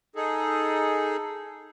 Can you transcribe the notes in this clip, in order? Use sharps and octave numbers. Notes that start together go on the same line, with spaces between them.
D#4 G#4 A4